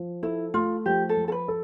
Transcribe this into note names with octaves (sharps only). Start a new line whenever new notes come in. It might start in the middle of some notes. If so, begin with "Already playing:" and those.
Already playing: F3
E4 A4
A3 F4
F3 G4
A4
F3
A4
B4
A4